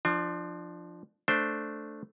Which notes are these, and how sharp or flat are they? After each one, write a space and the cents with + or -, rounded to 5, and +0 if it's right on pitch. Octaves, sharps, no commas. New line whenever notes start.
F3 +0 D4 +30
A3 +0 D4 +0 C5 +0